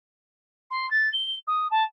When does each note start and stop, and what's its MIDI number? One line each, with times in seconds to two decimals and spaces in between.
0.70 0.88 84
0.90 1.09 93
1.12 1.35 103
1.47 1.67 87
1.70 1.83 81